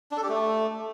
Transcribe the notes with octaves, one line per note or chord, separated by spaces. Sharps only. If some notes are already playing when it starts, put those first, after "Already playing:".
D4
A4
G4
A3